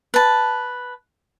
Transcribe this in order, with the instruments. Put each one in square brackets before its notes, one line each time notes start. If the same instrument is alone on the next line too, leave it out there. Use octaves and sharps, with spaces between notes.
[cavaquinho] B4 A5